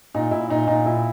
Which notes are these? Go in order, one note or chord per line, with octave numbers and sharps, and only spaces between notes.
A#2 D#4
A#2 E4
A#2 D#4
A#2 D#4
A#2 E4